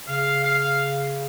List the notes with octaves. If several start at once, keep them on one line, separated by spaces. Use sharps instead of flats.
C#3 F5
F5